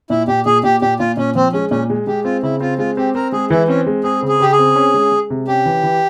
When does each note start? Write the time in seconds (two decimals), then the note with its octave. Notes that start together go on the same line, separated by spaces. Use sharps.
0.10 A#2 E4
0.28 A#2 G4
0.46 A#2 G#4
0.63 A#2 G4
0.81 A#2 G4
0.99 A#2 F4
1.17 A#2 C#4
1.35 F3 C4
1.53 G#3 C#4
1.71 A#2 C#4
1.90 G#3
2.07 G#3 G4
2.24 C4 F4
2.43 C#3 E4
2.60 C4 F4
2.78 G#3 F4
2.97 C4 G4
3.15 C4 A#4
3.32 G#3 G#4
3.50 E3 E4
3.68 C4 C#4
3.86 G#3
4.04 C4 G#4
4.23 C#3
4.28 G#4
4.40 C#3 G4
4.52 G#4
4.59 C4
4.76 C#4
4.94 G#3
5.12 G#3
5.30 C3
5.48 C#4 G4
5.66 E3
5.83 E3